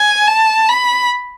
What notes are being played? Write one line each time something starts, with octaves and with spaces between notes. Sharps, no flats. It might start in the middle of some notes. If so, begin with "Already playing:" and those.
Already playing: G#5
A5
B5